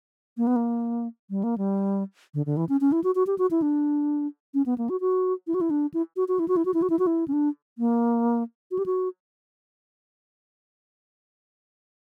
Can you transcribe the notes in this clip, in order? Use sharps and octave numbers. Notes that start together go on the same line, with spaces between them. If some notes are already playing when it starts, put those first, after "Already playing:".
A#3
B3
A#3
G3
A#3
G3
D3
D3
E3
C#4
C#4
E4
F#4
F#4
G4
F#4
E4
D4
C#4
B3
A#3
F#4
F#4
E4
F#4
E4
D4
E4
F#4
F#4
E4
F#4
E4
F#4
E4
F#4
E4
F#4
E4
C#4
D4
A#3
F#4
G4
F#4